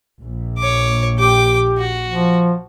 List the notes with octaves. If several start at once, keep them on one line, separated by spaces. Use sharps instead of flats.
A#1
C#5 D6
G4 G5 D6
F#4
F3